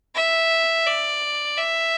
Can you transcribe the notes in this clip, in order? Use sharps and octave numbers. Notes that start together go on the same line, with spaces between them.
E5
D5
E5